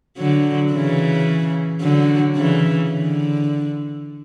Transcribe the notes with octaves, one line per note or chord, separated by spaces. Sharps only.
D3 F#3
C#3 E3
D3 F#3
C#3 E3
D3